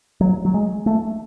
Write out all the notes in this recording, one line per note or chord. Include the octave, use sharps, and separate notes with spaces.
F#3
F#3
G#3
A3